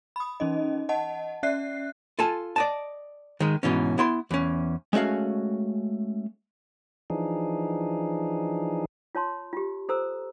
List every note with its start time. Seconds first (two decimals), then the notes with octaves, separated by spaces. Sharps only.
0.16 B5 D#6
0.40 E3 C#4 D#4 D#5
0.89 D#5 F#5 A5
1.43 C#4 D5 E5 F#6 C7
2.19 F4 A4 G#5 A5
2.56 D5 D#5 A5
3.40 D#3 G#3
3.63 G#2 B2 E3 C#4
3.98 B3 E4 C6
4.31 E2 C#4
4.93 G#3 A3 C#4 F#4 F5
7.10 E3 F3 D4 D#4 G#4
9.15 F4 C#5 A5 C6
9.53 F4 G4
9.89 A4 C5 A#5 E6